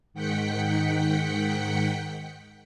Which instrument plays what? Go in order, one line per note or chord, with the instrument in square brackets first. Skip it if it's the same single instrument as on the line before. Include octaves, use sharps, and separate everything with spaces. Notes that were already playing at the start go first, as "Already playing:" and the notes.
[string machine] G#2 D#3 F#5 G5 B6 C#7